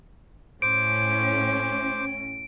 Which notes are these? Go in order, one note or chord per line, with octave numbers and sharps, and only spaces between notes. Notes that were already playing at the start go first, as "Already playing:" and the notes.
A2 C#4 C5 D6 D7